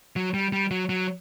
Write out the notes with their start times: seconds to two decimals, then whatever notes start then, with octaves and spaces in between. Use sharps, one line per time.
0.16 F#3
0.34 G3
0.52 G3
0.71 F#3
0.89 F#3